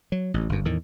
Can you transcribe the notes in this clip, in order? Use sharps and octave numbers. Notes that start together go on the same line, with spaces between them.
F#3
A1
G1 F#2
E2 A2 D#3